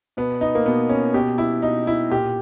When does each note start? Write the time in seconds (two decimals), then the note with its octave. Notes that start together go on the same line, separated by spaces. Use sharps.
0.17 B2 B3
0.41 D#4
0.55 A#3
0.66 B2 B3
0.89 C#4
1.14 B2 G4
1.38 E4
1.62 B2 D#4
1.87 E4
2.11 A#2 G4